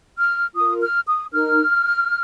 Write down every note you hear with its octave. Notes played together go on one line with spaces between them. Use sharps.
F6
F4 A#4 D#6
F6
D#6
D#4 A#4 F6